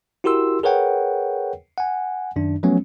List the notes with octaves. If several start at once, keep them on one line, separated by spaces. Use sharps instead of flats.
E4 F#4 G4 A#4 C6 E6
G#4 A#4 B4 C#5 F#5 G5
F#5 G#5
F#2 D#3 D4
F3 F#3 A3 B3 C#4